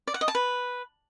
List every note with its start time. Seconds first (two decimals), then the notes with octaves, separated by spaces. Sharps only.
0.07 D5
0.14 F#5
0.21 D#5
0.28 A5
0.35 B4